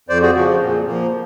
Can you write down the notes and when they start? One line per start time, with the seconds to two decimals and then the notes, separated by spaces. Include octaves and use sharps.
0.09 F2 C5 D5
0.22 F#4 G#4
0.35 C#3 F3 F#4
0.60 A#2
0.86 F3 A#3